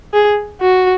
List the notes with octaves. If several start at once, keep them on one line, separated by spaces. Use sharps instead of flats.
G#4
F#4